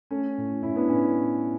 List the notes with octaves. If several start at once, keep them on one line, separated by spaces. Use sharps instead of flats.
A3 C#4
A2
A2 C#4 E4
B3 D4
A2 C#4